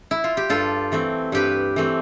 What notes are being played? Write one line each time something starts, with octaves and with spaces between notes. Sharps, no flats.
E4
F4
G4
G2 F4 A4
E3 A3 C4
G2 G4 B4
E3 A3 C4